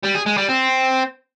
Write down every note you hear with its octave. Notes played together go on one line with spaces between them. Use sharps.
G3
G#4
G#3
G3
C4